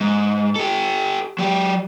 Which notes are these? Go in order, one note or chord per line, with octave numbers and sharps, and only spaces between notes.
G#2
G4 A4
F#3 G4